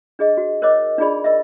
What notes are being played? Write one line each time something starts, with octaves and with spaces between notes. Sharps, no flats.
D4 G#4 D#5
F#4
A#4 C5 C#5 D#5 D6
D4 D#4 F4 G#4 D5 B5
A#4 D#5 E5